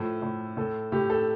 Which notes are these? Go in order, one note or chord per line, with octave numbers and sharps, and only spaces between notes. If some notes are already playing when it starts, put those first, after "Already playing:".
Already playing: A2 F3 A4
A2
A2 A4
A2 G4
A4